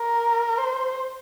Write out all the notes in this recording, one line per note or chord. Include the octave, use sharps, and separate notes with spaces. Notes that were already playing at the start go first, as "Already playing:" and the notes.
Already playing: A#4
C5